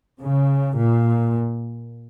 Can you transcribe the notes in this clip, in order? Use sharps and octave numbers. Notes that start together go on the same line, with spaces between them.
C#3
A#2